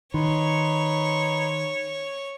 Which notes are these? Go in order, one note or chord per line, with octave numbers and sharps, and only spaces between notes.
D#3 D#4 B4 C#5 C6